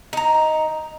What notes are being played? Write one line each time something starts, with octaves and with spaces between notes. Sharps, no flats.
D#4 A#5